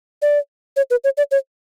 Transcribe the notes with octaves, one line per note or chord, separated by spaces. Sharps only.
D5
C#5
B4
C#5
D5
C#5